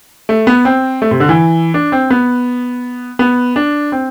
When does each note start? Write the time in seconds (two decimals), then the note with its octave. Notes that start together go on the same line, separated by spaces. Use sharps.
0.29 A3
0.47 B3
0.65 C4
1.02 A3
1.11 C3
1.20 D3
1.29 E3
1.74 D4
1.92 C4
2.10 B3
3.19 B3
3.56 D4
3.92 C4